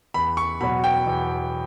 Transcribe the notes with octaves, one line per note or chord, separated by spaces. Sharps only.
E2 B5
C#6
B2 F#3 B5
G5
E2